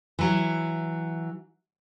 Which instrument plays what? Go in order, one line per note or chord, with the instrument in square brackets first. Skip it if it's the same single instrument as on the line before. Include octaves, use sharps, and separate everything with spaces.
[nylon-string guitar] E3 F#3